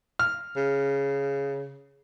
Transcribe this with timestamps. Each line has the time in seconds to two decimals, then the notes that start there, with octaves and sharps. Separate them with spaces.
0.19 F6
0.56 C#3